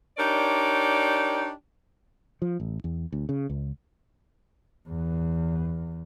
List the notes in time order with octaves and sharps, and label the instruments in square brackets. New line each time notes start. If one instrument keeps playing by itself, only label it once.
[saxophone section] D4 D#4 G4 A#4 C#5 D5
[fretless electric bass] F3
A1
E2
D2
C#3
C#2
[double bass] E2